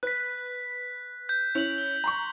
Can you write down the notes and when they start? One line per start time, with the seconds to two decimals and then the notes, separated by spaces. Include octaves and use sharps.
0.03 B4 F#6 B6
1.29 G6
1.55 C#4 E4 F7 F#7
1.78 G7
2.04 A#5 C6 C#6